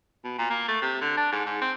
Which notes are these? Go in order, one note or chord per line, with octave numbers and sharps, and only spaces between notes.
B2
A#2
A#3
A3
C3
D3
D4
G#2
G#2
C4